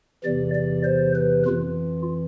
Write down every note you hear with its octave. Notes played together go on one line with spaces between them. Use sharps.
E2 C3 E3 D5
D5
C5
B4
F2 E3 F4